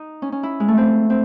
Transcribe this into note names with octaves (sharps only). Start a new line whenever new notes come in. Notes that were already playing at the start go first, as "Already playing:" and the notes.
Already playing: D#4
C#4
C#4
E4
G#3
A3
C4
C4